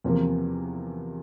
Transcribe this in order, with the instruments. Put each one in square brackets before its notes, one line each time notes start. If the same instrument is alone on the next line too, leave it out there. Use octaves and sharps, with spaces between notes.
[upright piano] E2 C3 F3 A#3